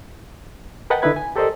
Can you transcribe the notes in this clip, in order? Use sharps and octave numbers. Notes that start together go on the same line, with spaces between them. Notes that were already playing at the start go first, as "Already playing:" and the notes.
A#4 B4 D#5 F#5 G5 A5
D3 D#4 E4 B4 G#6
G#5
G4 A4 A#4 C5 D5 D#5